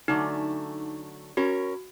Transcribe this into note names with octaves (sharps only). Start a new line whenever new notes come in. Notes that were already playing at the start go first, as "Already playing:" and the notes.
D3 F#3 A3 D#4
C#4 F#4 A#4 C#5